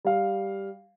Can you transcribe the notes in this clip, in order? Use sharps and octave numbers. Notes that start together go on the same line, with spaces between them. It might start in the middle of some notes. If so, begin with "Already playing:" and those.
G3 F5